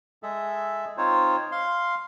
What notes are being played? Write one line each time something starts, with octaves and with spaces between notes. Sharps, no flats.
G#3 G#4 A4 E5
C4 D#4 F4 C5 C#5
F5 C6